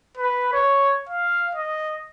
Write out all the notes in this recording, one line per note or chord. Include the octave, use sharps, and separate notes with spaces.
B4
C#5
F5
D#5